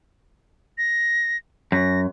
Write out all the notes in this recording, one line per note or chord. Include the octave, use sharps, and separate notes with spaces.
A#6
F#2 A#6